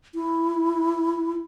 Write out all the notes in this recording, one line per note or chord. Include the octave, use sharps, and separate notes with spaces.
E4